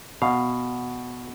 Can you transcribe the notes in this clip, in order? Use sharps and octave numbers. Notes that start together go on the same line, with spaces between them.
B2 F5